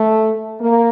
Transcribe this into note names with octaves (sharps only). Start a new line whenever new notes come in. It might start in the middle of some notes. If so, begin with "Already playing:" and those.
Already playing: A3
A#3